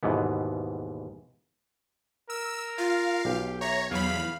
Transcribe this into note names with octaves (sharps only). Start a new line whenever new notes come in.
D#2 G#2 B2 E3 B3
A#4 E6
F4 F5
B1 G4
C#5 E5 A#5
E2 F#3 F5 B5